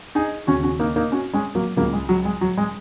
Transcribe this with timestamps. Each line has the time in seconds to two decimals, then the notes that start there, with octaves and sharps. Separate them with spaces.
0.15 D#4 G#4
0.47 D#2 C#3 C#4 F#4
0.63 C#4 F#4
0.79 A#3 D#4
0.96 A#3 D#4
1.12 C#4 F#4
1.33 G#3 C#4
1.55 F#3 A#3
1.76 C#2 C#3 F#3 A#3
1.93 G#3
2.09 F#3
2.25 G#3
2.41 F#3
2.57 G#3